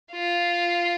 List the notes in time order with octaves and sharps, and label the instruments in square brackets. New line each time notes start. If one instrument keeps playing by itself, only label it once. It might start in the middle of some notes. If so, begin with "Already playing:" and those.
[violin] F4